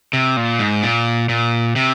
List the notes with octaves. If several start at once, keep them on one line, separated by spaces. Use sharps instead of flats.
C3
A#2
G#2
A#2
A#2
C3